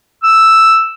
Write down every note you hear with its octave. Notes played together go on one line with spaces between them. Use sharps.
E6